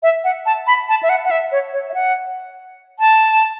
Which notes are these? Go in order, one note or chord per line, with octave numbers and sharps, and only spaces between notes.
E5
F#5
A5
B5
A5
E5
F#5
F#5
E5
C#5
C#5
E5
F#5
A5